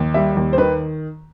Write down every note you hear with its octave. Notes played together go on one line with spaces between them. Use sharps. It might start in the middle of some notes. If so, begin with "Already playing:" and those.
Already playing: D#2
G3 E5
D#2
C5
D#3 B4